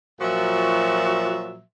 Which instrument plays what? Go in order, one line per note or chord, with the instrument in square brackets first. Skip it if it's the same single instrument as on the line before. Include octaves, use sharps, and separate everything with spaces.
[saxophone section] A#2 F3 F#3 F#4 E5